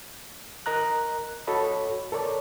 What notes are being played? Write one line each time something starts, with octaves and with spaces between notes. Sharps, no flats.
A#4 D#5 A#5 F#6
F#4 A4 C#5 D#5 B5
A4 A#4 C#5 D5